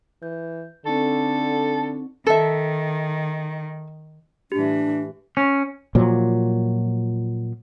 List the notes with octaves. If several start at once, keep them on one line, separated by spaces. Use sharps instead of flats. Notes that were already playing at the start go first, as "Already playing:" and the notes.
E3 G6
D3 C4 D#4 A4 C#6
D#3 A4 E5
A2 E3 D4 G4
C#4
A#2 F3 F#3